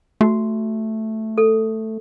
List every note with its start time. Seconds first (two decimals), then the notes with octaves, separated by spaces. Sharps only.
0.21 A3 F#4
1.38 A4